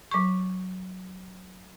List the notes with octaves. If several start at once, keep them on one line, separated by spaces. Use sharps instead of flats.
F#3 C#6